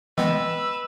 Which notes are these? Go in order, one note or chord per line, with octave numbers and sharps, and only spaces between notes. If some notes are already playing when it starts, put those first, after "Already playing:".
E3 G#3 B3 B4 D#5 G5 E6